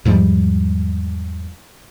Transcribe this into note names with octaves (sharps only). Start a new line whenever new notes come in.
E2 G#2 F3 G3